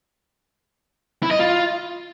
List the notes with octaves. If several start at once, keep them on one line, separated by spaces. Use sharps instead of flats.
E4
D#5
F4